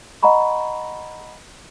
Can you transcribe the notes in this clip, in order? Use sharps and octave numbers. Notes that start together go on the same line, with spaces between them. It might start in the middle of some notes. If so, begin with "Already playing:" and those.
D#5 F#5 A#5 B5 C#6